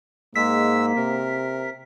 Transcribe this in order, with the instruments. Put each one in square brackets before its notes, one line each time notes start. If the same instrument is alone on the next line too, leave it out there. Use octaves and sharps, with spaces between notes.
[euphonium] G#2 [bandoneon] G#3 E6 [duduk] A#3 [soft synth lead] B6
[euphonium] C3 [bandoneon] A#4